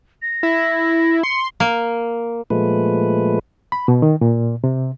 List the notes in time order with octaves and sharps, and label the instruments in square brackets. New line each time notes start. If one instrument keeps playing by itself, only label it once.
[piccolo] A#6
[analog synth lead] E4
[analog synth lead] C6 [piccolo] C#7
[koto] A#3
[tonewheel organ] A#2 F3 G#3 A3 B4
[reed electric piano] B5
B2
D#3
A#2
C3